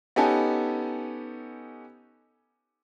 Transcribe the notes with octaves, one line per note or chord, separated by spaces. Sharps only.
B3 C#4 D#4 G4 A4 G#5